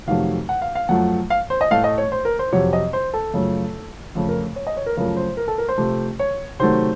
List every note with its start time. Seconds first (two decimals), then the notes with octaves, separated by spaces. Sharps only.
0.07 F2 C3 D#3 F#3 A3 F5
0.49 F#5
0.62 F5
0.75 F5
0.89 F#2 F3 A3 F#5
1.30 F5
1.50 C5
1.61 D#5
1.71 A2 A3 F5
1.84 D#5
1.98 C#5
2.12 C5
2.25 A#4
2.39 C5
2.52 F2 C3 F#3 C#5
2.73 D#5
2.93 C5
3.14 A4
3.34 F#2 C#3 F3 A3
4.15 F2 C#3 A3
4.29 A#4
4.56 C#5
4.67 D#5
4.77 C#5
4.86 A#4
4.97 F#2 C#3 F3 A3 A#4
5.17 C5
5.37 A#4
5.48 A4
5.58 A#4
5.68 C5
5.78 C3 F3 A3
6.19 C#5
6.59 C3 D#3 F#3 A3 C5